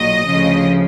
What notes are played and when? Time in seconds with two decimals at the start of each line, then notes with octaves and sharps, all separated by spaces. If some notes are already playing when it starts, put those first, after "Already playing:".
Already playing: B1 A#2 F#3 D#5
0.26 D2 C#3 F3